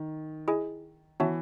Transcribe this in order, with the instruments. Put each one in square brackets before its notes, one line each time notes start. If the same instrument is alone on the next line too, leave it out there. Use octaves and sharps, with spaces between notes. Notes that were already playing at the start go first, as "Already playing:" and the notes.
Already playing: [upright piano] D#3
[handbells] E4 G#4 D#5 G#5
[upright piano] E3 [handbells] B3 F#4 C#5 E5 A5